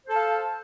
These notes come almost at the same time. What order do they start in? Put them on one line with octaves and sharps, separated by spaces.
C5 A4 A5 F5